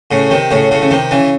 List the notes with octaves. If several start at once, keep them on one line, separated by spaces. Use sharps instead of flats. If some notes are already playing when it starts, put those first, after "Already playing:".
A2 C#3
C3 D#3
A2 C#3
A2 C#3
C#3
C3 D#3
C#3 E3